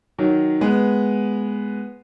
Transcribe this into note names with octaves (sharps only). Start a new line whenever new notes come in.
D#3 F#3
G#3 B3